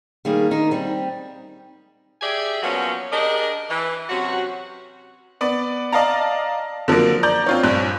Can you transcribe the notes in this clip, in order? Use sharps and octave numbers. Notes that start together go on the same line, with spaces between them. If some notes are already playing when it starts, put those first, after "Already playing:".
D#3 G3 A#3 G#4
D#3 D#4
G3 C4
G4 G#4 D5 E5 G5 G#5
F3 F#3 A#3 B3 C#4 F#4
D4 G4 G#4 A#4 D#5
E3
C3 F#3 C#4 F#4
B3 D5
D5 D#5 F5 A5 A#5
D3 F3 F#3 A#3
D5 A#5 G6
C4 F4 C#5
A#1 G2 C6 F#6